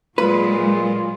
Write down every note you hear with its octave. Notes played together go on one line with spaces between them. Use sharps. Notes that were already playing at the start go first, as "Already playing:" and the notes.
A#2 F#3 G#3 F4 B4